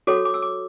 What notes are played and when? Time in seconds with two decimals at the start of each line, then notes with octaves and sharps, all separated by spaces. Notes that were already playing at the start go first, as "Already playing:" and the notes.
0.07 F#4 A4 C#5 D6
0.25 D6
0.34 E6
0.42 D6